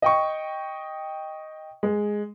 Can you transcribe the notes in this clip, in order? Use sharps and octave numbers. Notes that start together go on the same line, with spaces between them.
D#5 G5 C#6
G#3